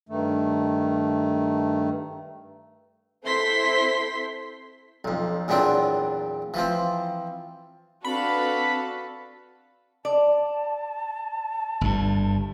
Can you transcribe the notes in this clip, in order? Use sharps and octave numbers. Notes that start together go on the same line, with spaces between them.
G2 D#3 A3
C4 E4 A4 C5 C6 B6
B1 F2
E2 A#2 F#3 C4 D4
E3 F3 C4
C4 D4 F#4 A4 B4 F5 B5
D5 A5
G1 G2